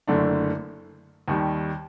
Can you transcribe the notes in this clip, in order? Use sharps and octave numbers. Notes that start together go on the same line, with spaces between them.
F#1 F#2 D3 A3 D4
D#2 D#3 G3